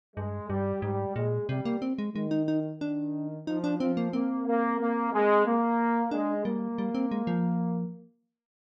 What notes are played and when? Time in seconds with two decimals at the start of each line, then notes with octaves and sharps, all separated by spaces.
0.16 G2 G#3
0.50 G2 G3
0.82 G#2 G3
1.16 A#2 G#3
1.49 C3 G3
1.65 A#3
1.82 C4
1.98 G#3
2.15 D#3 G#3
2.31 D#4
2.48 D#4
2.81 D#3 D4
3.47 F3 D#4
3.64 D4
3.80 F3 C4
3.97 A#3
4.13 A#3 C4
4.47 A#3
4.80 A#3
5.13 G#3
5.46 A#3
6.11 G#3 D4
6.45 G3 A#3
6.78 G3
6.95 C4
7.11 G#3
7.27 F3